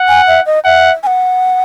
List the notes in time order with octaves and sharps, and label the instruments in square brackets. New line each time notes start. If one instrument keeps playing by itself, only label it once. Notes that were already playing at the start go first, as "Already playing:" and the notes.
Already playing: [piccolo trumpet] F#5
[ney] G#5
E5
D#5
[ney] E5 [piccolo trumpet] F#5
[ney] G#5
F#5